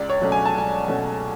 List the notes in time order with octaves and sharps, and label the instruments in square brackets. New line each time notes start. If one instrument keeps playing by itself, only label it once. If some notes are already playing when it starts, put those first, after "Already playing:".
Already playing: [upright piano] C#2 D5
C#5
B2 F#3 A3 C#4
G#5
A5
C#2 G#5
B2 F#3 A3 C#4